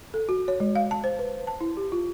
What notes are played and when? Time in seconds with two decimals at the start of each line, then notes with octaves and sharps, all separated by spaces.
0.14 A4
0.29 F#4
0.48 C#5
0.60 G#3
0.76 F5
0.91 A5
1.04 C5
1.19 B4
1.47 A5
1.61 E4
1.77 G4
1.92 F4